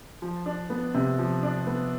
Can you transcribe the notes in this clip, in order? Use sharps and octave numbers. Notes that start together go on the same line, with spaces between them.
F3
D4
B3
C3
F3
D4
B3